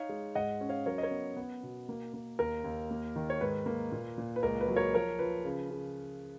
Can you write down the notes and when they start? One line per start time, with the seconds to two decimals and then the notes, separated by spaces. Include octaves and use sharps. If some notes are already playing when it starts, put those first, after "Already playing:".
Already playing: D#4 C#5 F5
0.09 G#3
0.35 G#2 D#5 F#5
0.61 C#4
0.69 C#5 F5
0.86 F#3 A#4 C#5
0.98 D#5
1.03 A#4 C#5
1.11 B3
1.37 B3
1.63 B2
1.89 A#3
2.14 A#3
2.39 D#2 A#4
2.64 D#2
2.91 A#3
3.16 D#3
3.30 C#5
3.41 G#2 B4
3.66 A#3
3.92 A#2
4.18 A#2
4.36 B4
4.43 C#2 A#4
4.61 B4
4.68 F#3
4.76 A#4 C#5
4.93 F3 A#4 C#5
5.19 F3 B4
5.45 C#3
5.70 C#3